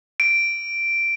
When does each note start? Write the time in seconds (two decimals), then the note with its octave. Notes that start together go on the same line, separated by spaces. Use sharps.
0.20 D7